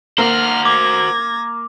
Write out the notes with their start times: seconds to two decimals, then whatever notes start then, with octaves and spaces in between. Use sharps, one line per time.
0.18 A#3 F#4 C5 F6
0.65 D6 G#6 A#6